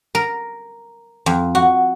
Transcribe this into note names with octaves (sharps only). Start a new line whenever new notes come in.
A#4
F2
F#4